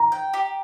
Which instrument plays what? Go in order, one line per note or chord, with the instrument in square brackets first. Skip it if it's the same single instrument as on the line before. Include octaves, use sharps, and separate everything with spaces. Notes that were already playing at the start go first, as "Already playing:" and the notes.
Already playing: [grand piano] A#5
[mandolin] G5
G4